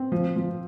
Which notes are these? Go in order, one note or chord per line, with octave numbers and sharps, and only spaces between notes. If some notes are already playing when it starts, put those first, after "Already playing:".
Already playing: C4
F3
F3